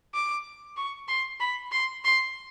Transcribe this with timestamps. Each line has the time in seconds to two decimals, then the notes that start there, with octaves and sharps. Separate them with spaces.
0.14 D6
0.77 C#6
1.08 C6
1.40 B5
1.72 C6
2.05 C6